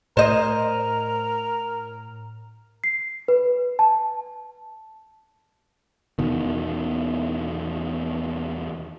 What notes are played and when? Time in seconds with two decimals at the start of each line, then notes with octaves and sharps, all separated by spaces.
0.17 A2 A#4 C5 D#5
2.84 C7
3.28 B4
3.79 A5
6.19 E2 B2 D#3